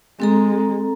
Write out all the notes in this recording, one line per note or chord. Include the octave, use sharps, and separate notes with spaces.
G#3 C4 A4 A#5